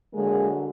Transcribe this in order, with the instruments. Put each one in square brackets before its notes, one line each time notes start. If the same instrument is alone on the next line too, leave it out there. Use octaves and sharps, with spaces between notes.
[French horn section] D3 F#3 G#3 A#3 G#4